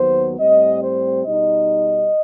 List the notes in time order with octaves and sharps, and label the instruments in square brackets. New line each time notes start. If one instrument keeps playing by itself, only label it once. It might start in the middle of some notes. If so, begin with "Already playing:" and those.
Already playing: [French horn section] D#2 D#3 F#3 B3 C5
A2 G3 C4 D#5
C5
B2 G3 D#4 D#5